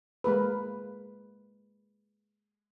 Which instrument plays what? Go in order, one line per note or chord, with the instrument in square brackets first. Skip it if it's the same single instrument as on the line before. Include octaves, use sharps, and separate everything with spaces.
[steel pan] G#3 A#3 A#4 B4